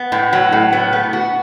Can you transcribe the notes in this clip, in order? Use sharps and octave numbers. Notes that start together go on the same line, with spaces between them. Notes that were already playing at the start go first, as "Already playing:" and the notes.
Already playing: B3
A2
F#3
A2
B3
B3
F#4